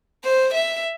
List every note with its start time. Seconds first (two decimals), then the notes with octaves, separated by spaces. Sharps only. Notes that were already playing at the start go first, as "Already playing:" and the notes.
0.24 C5
0.54 E5